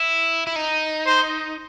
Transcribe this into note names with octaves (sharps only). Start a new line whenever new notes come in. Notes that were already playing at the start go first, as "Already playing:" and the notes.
Already playing: E4
E4
D#4
C5